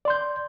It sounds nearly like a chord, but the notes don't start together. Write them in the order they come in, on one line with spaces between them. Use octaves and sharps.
D5 C6 G6